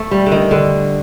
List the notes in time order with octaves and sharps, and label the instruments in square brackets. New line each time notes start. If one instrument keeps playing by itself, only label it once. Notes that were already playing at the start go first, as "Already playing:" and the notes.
Already playing: [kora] A3
G3
D3
D#3
D3